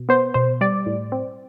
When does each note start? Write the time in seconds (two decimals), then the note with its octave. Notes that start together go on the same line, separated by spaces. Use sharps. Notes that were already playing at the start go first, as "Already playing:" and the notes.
Already playing: B2
0.09 B3 C5
0.34 B2 C5
0.61 G3 D5
0.86 A2
1.12 C4